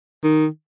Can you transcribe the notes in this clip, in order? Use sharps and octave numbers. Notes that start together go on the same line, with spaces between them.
D#3